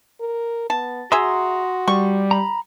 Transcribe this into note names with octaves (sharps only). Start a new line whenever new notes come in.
A#4
B3 A5
F#4 G#4 E5 A#5 C6 D#6
G3 C#6
A#5 B5